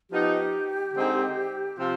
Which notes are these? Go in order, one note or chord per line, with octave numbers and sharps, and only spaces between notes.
F3 B3 D#4 G4
D3 G#3 C4 D#4
C3 F3 C4 F4